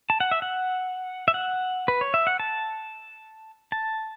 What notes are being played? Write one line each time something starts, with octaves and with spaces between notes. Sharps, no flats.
A5
F#5
E5
F#5
E5
F#5
B4
C#5
E5
F#5
A5
A5